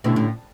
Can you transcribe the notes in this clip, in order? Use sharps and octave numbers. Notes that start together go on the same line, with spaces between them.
B2 D3 A3 C#4 E4 G4
A2